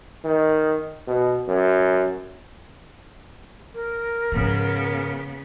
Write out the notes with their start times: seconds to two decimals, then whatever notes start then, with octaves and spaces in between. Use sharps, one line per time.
0.25 D#3
1.08 B2
1.48 F#2
3.74 A#4
4.32 G#2 C#3 F3 B3